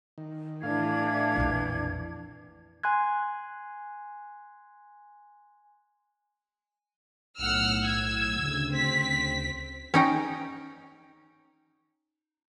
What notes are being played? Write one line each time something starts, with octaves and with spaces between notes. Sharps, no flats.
D#3
A2 E3 D4 F5 G#6
A#1 F2
G#5 C6 F#6 G#6
B1 A2 F#5 E6 F6
E6 G#6
D2 C#3
C4 B6
C#4 D#4 G5